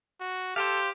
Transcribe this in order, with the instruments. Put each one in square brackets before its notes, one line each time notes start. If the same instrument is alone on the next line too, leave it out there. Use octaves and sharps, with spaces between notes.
[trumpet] F#4
[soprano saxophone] G4 [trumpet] A4 [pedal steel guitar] C5 F5